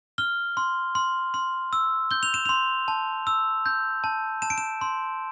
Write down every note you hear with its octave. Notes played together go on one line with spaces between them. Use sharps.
F6 G7
C6
C6
C6
E6
G6 G7
F7
E7
C6 F7
A5
E6
G6
A5
A5 E7
D7
E7
C6